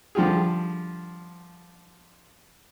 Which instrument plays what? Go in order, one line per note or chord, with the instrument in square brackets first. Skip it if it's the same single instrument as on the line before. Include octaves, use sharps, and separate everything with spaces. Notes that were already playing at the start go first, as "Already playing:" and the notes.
[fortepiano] D3 F3 G3 F4 G4 G#4